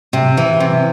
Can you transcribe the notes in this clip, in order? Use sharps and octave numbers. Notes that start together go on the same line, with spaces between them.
C3
E3
C3